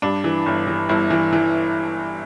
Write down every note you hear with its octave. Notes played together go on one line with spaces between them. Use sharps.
G2 D4
E3
G1
E3
G1 E4
E3
E3